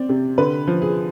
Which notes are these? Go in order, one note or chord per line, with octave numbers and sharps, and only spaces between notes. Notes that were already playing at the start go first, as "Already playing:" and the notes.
Already playing: C4 D5
C3
D3 B4
F3
G#4